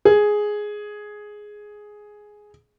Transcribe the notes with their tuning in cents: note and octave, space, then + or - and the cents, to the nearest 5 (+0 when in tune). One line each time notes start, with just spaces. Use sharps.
G#4 +5